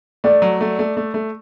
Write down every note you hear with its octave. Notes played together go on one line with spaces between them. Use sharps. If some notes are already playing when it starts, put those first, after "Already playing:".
A3 D5
F#3
A3
A3
A3
A3